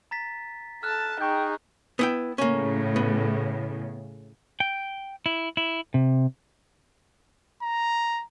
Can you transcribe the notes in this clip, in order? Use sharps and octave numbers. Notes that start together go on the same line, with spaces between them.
A#5 A6 B6
A4 A5 F6 F#6
D#4 G#4 G5 A#5 C#6 G6
B3 E4 G5
A2 C#3 A#3 C#4
B3
G5
E4
E4
C3
A#5